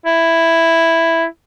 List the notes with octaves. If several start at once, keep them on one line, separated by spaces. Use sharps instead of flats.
E4